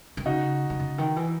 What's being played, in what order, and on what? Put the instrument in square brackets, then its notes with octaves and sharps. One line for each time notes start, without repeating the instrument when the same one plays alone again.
[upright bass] D#3
[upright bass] C#3 [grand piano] D#4 F#4
[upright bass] D#3
C#3
D#3
E3